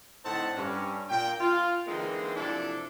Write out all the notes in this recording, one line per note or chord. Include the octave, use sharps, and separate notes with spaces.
A2 D3 C4 D#4 F#5 A5
G2 C#4
A#2 G5
F4
D3 E3 G#3 A#3 C4 D#4
C3 F3 D4 E4 A4